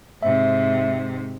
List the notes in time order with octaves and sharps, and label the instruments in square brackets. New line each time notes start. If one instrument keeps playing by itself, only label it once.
[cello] G#2 C3 [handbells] E5